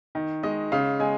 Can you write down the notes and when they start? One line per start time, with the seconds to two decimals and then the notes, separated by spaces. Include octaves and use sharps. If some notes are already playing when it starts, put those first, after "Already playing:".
0.15 D#3
0.43 G#3 D#5
0.72 C#3 F5
1.00 G#3 G#5